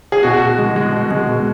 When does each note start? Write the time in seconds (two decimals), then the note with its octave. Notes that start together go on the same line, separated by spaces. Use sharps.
0.12 G#4
0.23 B2 F#4
0.41 B2
0.58 G#3
0.76 G#3
0.93 B2
1.11 G#3
1.29 B2